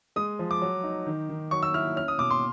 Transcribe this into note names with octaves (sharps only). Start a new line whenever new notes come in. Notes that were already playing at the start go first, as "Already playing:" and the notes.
G#3 D#6
F3
D6
F#3
D#4
D#3
D#3
F#3 C#6
E6
E4 F6
C#4 F6
D#6
B2 D6
C6